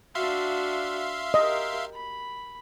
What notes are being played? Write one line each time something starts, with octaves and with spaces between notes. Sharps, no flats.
D4 F#4 E5 F5 C6
G4 A#4 D#5
B5